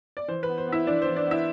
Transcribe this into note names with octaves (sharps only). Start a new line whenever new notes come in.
D5
E3 C5
B4
B3
C5
B3
E4 E5
E3 D4 D5
E3 C5
D4 D5
B3
E4 E5